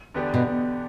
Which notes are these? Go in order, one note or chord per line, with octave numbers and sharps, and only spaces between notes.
E2 D3 B3 G4 D5
B2